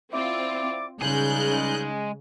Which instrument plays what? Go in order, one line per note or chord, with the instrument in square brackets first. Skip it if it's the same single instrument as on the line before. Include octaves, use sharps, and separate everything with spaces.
[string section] C4 F4 [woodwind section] E4 D5 D6
[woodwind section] C#2 G3 D#4 [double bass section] C#3 [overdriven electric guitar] G#3 G#4 [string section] F#6 G6